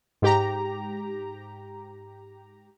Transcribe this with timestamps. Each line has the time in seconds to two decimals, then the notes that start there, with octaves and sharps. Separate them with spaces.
0.22 G#2 G4 A#5